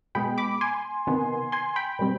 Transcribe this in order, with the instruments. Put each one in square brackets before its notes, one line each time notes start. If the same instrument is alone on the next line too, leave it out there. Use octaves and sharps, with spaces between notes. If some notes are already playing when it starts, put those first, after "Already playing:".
[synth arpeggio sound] B2 G#3 B3 G5 B5
B5 D6
G#5 C6
C3 D#3 B3
G#5 C6
G5 B5
B2 G3 C4